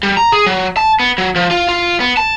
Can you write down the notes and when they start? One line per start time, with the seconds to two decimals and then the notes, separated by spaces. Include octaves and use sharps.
0.03 G3
0.17 A#5
0.32 G#4
0.46 F#3
0.77 A5
1.00 B3
1.18 F#3
1.36 F3
1.51 F4
1.68 F4
2.00 B3
2.17 A5